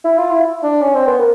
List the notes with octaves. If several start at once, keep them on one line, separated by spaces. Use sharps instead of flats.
E4
F4
E4
D4
C#4
C4
B3
A#3